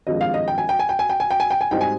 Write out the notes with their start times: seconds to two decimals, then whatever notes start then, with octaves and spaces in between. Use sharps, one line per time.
0.07 G#1 G2 F3 G#3 D#5
0.21 F5
0.34 D#5
0.48 G5
0.58 G#5
0.69 G5
0.79 G#5
0.89 G5
0.99 G#5
1.10 G5
1.20 G#5
1.31 G5
1.40 G#5
1.51 G5
1.61 G#5
1.71 G#2 G3 C4 D#4 G5
1.81 G#5